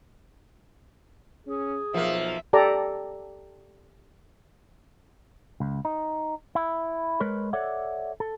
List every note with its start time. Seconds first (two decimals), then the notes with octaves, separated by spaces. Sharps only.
1.47 C#4 G#4
1.94 B1 F3 A#3 E5
2.53 G4 A4 D5 A#5
5.60 C#2
5.85 D#4
6.55 E4
7.20 G#3 A#4 B4 C#5
7.53 A4 C#5 D5 E5 F#5
8.20 A4